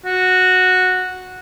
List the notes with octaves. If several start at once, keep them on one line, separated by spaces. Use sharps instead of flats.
F#4